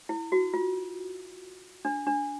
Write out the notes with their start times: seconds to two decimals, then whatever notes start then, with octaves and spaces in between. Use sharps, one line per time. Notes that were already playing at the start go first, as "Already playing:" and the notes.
0.09 E4
0.32 F#4
0.54 F4
1.85 D4
2.06 D4